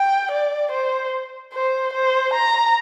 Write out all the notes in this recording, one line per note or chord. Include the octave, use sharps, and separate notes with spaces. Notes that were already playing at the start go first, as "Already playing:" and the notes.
Already playing: G5
D5
C5
C5
C5
A#5